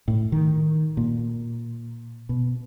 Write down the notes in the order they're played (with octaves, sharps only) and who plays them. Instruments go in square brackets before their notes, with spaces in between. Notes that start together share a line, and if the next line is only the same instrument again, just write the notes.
[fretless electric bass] A2
D#3
A#2
B2